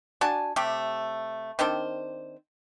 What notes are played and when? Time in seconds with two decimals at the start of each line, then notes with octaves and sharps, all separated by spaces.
0.21 D4 F#4 G#5 A5
0.56 C3 A3 G4
1.59 D#3 C4 D4 C5